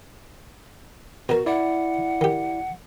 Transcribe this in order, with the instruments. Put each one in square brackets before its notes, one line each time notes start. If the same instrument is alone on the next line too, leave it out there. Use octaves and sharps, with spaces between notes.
[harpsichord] B2 A#4 [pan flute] F#4
[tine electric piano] E4 D5 [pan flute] F#5
[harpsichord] D#3 G4